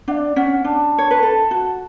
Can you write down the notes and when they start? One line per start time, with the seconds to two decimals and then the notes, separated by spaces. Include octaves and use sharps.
0.08 D4 F#5
0.12 D5
0.36 C#4 F#5
0.64 D4 A5
0.98 C#5
1.11 B4
1.23 A4
1.51 F#4